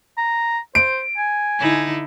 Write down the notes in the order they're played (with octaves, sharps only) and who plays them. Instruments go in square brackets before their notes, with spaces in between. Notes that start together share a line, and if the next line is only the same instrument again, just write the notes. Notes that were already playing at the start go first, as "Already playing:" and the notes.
[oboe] A#5
[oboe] C5 [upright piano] D7
[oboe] G#5
[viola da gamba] D3 D#4 E4